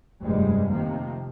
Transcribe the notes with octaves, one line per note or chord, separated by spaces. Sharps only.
F1 G2 C3 G3 G#3
C3 D#3 F3 A#3